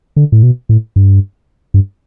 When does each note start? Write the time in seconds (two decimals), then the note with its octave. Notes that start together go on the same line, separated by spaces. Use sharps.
0.16 D3
0.32 A2
0.43 B2
0.69 A2
0.96 G2
1.74 G2